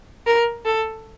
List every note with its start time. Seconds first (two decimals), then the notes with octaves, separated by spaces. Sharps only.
0.27 A#4
0.65 A4